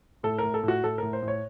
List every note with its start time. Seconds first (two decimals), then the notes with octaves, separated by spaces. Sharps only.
0.23 A2 A4
0.38 A2 A#4
0.54 A4
0.63 A2
0.68 F#4
0.83 A2 A4
0.98 A2 A#4
1.13 C5
1.22 A2
1.28 C#5